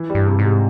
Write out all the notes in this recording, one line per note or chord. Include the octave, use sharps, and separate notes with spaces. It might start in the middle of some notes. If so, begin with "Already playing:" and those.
Already playing: E3
G3
G2
C3
G#2
C3